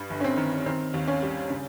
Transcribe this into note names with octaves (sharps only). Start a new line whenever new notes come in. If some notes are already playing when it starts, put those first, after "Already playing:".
Already playing: G2 G3
G1
C#4
C4
D#3
D#3 C4
D#2
C#4
G3
C#3